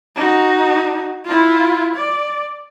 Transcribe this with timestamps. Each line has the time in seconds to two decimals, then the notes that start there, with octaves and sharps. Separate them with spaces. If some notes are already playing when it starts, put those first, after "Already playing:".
0.16 D#4 F#4
1.25 E4 F4
1.95 D5